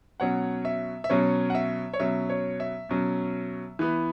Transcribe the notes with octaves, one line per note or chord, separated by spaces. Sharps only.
B2 F#3 C#4 C#5 F#5
E5
E5
B2 F#3 C#4 C#5
F#5
E5
C#5
B2 F#3 C#4 E5
C#5
E5
B2 F#3 C#4
E3 B3